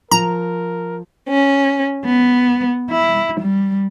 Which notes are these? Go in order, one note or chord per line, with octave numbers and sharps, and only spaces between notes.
F3 A#4 A#5
C#4
B3
E4
G3